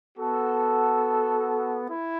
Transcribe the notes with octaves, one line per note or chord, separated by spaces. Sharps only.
B3 F#4 A4
E4